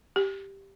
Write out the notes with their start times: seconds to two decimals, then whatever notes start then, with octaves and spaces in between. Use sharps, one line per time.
0.16 G4